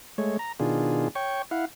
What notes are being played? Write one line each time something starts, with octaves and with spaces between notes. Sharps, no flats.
G#3 A3 C#5
A#5
B2 D#3 D4 F4 G#4
C#5 G5 C#6
E4 F5 F#5